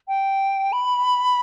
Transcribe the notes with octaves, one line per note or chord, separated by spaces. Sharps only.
G5
B5